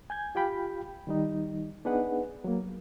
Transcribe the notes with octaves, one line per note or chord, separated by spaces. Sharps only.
G#5 G6 G#6
F4 G4 F5 G5 B5
D#3 G3 D#4
B3 D4 D#4 G#4 B4 F#5
F#3 A#3